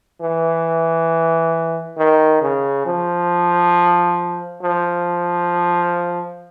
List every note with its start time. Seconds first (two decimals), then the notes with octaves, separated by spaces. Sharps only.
0.21 E3
1.98 D#3
2.42 C#3
2.86 F3
4.63 F3